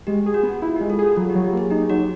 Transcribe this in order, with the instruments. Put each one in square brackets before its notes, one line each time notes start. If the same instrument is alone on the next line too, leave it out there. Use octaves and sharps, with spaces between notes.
[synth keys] G#3 [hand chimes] G4
[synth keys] G#4
[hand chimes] F#4
[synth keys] B3
[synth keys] E4 [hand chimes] F4
[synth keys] G#3 [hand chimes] G4
[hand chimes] A4
[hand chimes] F#4 [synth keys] G#4
[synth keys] F#3 [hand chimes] F4
[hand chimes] G4
[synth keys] F#3
[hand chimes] G4
[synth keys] A#3 [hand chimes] G#4
[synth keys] D#4 [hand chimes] G4
[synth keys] F#3 [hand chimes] F#4